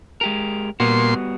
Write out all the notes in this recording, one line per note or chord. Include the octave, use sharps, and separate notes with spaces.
G#3 G4 A#4
A#2 G3 B3 F#4 C6